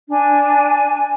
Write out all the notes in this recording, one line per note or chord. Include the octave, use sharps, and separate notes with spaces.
D4 G#5